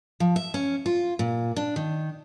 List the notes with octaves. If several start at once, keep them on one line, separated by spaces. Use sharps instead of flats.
F3
E5
C#4
F4
A#2
D4
D#3